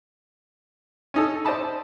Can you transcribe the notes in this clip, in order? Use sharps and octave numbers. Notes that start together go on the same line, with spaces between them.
C#4 D#4 A4
C5 D5 D#5 A5 B5